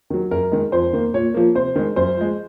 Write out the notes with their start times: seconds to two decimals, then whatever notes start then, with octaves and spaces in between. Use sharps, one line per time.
0.10 D#3 F#3
0.31 F#2 A#4
0.52 D#3 G#3
0.72 F2 C5
0.93 D#3 A#3
1.14 A#2 C#5
1.34 F3 A#3
1.55 C3 C5
1.76 D#3 G#3
1.96 F#2 C5
2.17 F3 G#3